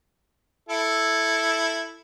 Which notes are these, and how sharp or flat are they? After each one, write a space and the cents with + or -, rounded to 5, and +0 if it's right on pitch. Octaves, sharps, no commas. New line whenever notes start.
E4 +0 A4 +0